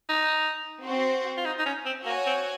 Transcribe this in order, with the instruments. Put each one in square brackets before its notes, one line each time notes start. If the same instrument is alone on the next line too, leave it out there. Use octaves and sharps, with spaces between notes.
[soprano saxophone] D#4
[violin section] C4 F#4 C5
[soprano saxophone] F4
D#4
D#4
C#4
C4
[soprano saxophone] A#3 [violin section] F#4 C#5 G#5
[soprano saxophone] C4